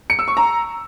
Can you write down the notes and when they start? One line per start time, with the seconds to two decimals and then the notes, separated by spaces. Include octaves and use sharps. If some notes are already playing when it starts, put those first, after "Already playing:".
0.10 C#7
0.19 E6
0.28 C#6
0.37 A#5